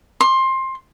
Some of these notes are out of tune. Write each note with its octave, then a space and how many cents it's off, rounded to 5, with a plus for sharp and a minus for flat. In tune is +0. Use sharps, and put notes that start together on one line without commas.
C6 +20